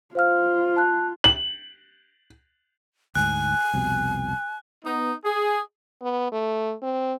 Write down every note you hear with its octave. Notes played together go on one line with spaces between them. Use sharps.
F4 C5 F5 F6
A5 F#6
F#7
D2 G#2 G#5 F#6
C2 F2 B2
B3 D#4
G#4
B3
A3
C4